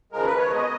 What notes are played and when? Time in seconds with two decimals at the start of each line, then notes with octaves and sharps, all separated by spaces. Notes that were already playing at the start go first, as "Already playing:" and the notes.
0.12 D#2 C#3 F3 G#3 A#4
0.26 B4
0.38 C#5
0.50 B2 G#3 D#5